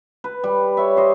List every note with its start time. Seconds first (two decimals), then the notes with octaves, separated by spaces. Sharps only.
0.24 B4
0.44 G3
0.77 C#5 E5
0.96 G4 C5 D#5